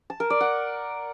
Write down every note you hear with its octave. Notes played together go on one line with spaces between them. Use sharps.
A5
A#4
D5
F#5